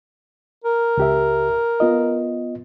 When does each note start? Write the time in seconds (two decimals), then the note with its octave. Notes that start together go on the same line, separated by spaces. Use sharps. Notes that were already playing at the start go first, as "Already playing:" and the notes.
0.64 A#4
0.97 C#2 G4 E5
1.80 B3 F4 D#5